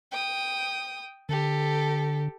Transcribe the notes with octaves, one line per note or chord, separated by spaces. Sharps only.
G5 D#6
D3 G4 A4